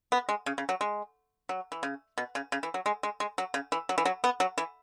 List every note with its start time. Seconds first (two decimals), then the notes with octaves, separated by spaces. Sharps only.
0.12 B3
0.29 G#3
0.46 C#3
0.58 C#3
0.69 F#3
0.81 G#3
1.49 F#3
1.72 E3
1.83 C#3
2.18 B2
2.35 C#3
2.52 C#3
2.63 E3
2.74 F#3
2.86 G#3
3.03 G#3
3.20 G#3
3.38 F#3
3.54 C#3
3.72 E3
3.89 F#3
3.98 E3
4.05 F#3
4.24 B3
4.40 F#3
4.58 E3